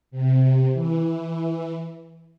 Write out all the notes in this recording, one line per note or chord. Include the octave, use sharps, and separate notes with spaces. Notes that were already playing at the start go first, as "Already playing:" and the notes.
C3
E3